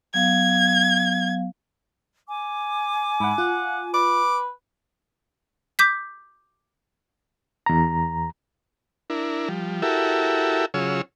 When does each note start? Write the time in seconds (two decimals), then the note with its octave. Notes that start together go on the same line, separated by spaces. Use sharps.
0.14 F#3 B3 F5 G#6
2.27 G#5 D6
3.20 G#2 E4 F#5
3.38 F4 F#5
3.94 B4 D6
5.79 D6 G6 B6
7.66 E2 A#5
9.10 D4 E4 A#4
9.49 F3 G3
9.82 E4 F#4 G4 A4 A#4 E5
10.74 C#3 F#3 F4 G#4 C#5 E6